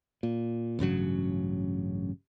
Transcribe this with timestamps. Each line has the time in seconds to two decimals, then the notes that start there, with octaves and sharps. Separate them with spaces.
0.23 A#2
0.79 A1 G2 C#3 F#3